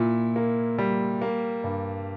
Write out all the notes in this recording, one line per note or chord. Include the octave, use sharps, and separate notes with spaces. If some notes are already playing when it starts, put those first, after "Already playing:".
Already playing: A#2 E4
A#3
G3
A#3
G2